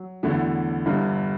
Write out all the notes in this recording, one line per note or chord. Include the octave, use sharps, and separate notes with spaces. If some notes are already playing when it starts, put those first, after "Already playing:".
Already playing: F#3
E2 D3 F#3 A3 E4
G1 G2 D3